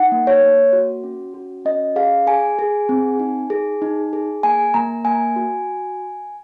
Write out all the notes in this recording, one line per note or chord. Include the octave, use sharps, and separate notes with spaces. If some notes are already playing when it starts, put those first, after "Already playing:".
Already playing: D#4 F#5
A#3
C#5
A#3
F#4
C#4
F#4
C#4 D#5
G#4 F5
G#4 G#5
G#4
C4
D#4
G#4
D#4
G#4
A#3 G#5
A#3 A#5
A#3 G#5
F#4